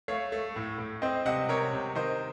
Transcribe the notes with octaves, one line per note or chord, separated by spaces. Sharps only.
A3 C#5 F5
A3
A2
A2
C4 C5 D#5
C3 D#5 F#5
C3 A#4 C#5
C3
D#3 C5 D#5